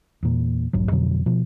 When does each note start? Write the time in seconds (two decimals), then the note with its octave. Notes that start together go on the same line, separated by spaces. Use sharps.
0.23 E2 A#2
0.73 F1 B1 G#2 F#3
0.91 F2 B2 D3 F#3
1.26 B2 F3